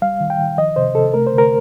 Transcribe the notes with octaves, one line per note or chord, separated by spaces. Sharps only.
G3 F5
D#3
G5
D#3
F3 D#5
C3 C5
C3 A4
A3 A#4
C5
D3
A#4